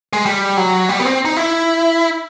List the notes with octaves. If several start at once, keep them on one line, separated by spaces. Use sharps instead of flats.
G#3
G3
F#3
G3
B3
C4
D#4
E4